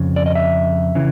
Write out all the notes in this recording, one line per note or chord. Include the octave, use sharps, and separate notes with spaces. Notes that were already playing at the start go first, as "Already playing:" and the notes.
Already playing: F2 C#3
D5
D#5
E5
C#3 E3